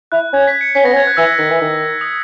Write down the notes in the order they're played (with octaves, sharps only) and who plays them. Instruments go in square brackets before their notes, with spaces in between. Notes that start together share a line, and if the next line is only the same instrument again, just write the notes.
[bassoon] E4 [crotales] F#6
[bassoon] C#4 [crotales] G#6
[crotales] B6
C#7
[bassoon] C#4 [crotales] B6
[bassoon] B3 [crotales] A#6
[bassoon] C#4
[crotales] G#6
F#6
[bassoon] E3 [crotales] E6
[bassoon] D#3
E3
D#3
[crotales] D#6